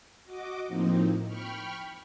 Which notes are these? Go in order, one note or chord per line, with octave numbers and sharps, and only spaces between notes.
F#4 D#5 D6
A2 F3 A#3 C4 D#4
G5 B5 C#6 F6